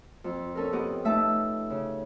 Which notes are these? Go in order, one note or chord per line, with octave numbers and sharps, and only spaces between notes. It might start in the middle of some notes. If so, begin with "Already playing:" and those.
F2
C#4 A4 A#4
B3 G4 D#5
A3 D#4 E5 A5
C#3